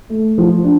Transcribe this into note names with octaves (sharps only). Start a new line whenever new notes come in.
A3
F3
D4